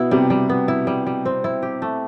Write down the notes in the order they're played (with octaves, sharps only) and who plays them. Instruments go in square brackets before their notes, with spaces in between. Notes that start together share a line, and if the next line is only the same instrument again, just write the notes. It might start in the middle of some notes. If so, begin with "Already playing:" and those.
Already playing: [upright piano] B2 [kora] B3 E4
[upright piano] C3 [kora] G3
[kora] G3
B3
E4
G3
G3
C4
E4
G4
A3